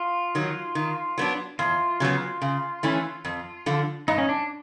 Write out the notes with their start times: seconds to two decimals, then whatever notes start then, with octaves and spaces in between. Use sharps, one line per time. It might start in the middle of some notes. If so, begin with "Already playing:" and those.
Already playing: F4
0.35 D#3 F#3
0.75 D#3
1.18 F#3 B3 D4
1.59 E2 F4
2.00 C#3 F#3 B3
2.42 C#3
2.83 E3 A3 C#4
3.25 F2
3.66 D3 F3
4.08 G2 D#4
4.18 C#4
4.29 D4